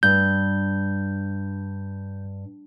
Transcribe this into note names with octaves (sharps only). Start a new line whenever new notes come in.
G2 G6